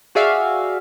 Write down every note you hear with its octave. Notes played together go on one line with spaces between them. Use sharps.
F#4 G#4 D5 E5 F5